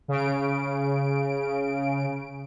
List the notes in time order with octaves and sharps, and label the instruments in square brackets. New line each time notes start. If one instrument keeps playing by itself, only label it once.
[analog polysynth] C#3 D7